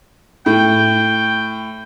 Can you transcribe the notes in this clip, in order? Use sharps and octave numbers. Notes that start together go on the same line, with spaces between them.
A2 G5